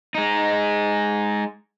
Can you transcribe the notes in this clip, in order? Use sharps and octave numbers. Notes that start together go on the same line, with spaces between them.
G#3 D#4